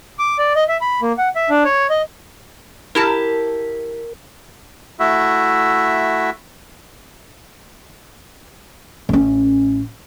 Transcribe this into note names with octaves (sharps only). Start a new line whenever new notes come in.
D6
D5
D#5
E5
B5
A#3
F#5
E5
D4
C#5
D#5
E4 G4 A#4 A5
A3 E4 F#4 E5
A1 C#4